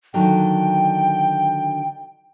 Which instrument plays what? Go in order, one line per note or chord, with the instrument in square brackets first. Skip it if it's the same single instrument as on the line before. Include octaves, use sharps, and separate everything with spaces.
[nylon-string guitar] D3 D#3 F#3 [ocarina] G5